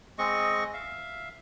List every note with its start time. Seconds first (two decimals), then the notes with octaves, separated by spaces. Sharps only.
0.18 G#3 C4 D#5 C#6
0.74 E5 F5